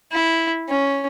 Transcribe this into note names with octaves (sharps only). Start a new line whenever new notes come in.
E4
C#4